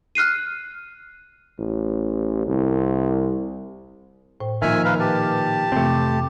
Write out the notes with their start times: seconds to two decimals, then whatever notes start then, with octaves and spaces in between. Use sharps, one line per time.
0.15 F6 F#6 C7 D#7
1.59 A1
2.47 C2
4.40 A2 C5 G5
4.62 A#2 D#3 F3 E5 G#5 F6
4.85 A#4 B4 F5
5.00 G4 B4 A5 F6
5.72 F2 C3 E3 A3 C4